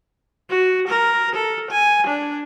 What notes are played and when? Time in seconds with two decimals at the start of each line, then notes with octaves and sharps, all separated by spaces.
0.49 F#4
0.88 A#4
1.35 A4
1.71 G#5
2.07 D4